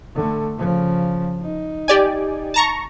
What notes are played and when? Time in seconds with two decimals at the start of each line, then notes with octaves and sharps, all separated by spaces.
0.15 D3 A3
0.56 C#3 F3
1.42 D#4
1.88 G4 D5 G#5
2.54 A5 A#5 C#6